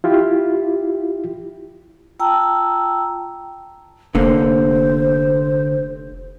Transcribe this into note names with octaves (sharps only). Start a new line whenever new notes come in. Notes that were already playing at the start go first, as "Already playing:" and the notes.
E4 F4 G4
F4 G5 A5 A#5 E6
F1 D3 A#3 C5